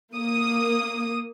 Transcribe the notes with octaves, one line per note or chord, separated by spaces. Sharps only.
A#3 D#6